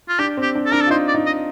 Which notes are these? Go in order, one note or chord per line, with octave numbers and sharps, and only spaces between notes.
F4
D4 G4
C4
G4
D4
A4
D4 A#4
A4
F4
D#4 C5
D5
D#4
D#5